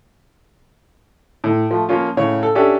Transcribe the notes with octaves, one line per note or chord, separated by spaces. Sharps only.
A2
F3 A3
F3 A#3 C#4 F4
A2 C#3 C#5
A4
C#4 D4 G4 A4 E5